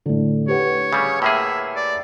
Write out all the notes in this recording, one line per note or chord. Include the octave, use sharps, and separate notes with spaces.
A2 D3
G4 B4 C#5 F#5
C#3 G3
A2 A#3 G#4 E5
D5